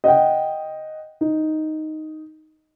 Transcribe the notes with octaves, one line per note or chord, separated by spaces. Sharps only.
D#5 F#5 G5
D#4